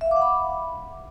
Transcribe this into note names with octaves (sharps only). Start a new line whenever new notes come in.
E5
F5
D6
F#5
B5